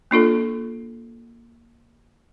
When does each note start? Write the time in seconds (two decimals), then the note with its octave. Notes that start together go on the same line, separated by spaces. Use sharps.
0.11 A#3 D4 F4 A4